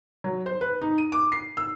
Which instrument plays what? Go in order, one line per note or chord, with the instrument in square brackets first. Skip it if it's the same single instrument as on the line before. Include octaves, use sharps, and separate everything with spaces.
[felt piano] F#3
C5
B4
D#4
D#7
D6
C7
E6